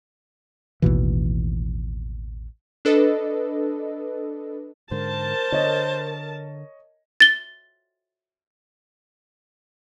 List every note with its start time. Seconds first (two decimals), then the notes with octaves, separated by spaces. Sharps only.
0.82 A1 D#2 B2 E3
2.85 D4 A4 B4 D#5
4.91 G#2 D3 A#4 C5 A5
5.52 D3 C#5 D#5
7.20 A6 G7